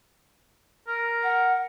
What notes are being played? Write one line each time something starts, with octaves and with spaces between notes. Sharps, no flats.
A#4
F#5